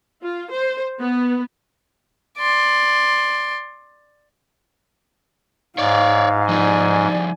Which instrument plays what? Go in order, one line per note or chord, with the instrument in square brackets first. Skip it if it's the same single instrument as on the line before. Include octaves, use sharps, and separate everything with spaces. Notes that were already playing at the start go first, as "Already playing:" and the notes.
[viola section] F4
C5
B3
[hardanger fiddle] D5 C6
[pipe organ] G#2 [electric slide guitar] C#5 D5 [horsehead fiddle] F5
[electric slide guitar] F3 G3 D#4 [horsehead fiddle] D5 G#5